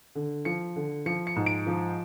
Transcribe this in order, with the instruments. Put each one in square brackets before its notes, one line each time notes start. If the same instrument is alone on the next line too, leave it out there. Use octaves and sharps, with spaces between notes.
[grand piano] D3
F3 C#7
D3
F3 C#7
C#7
G#2
D7
F3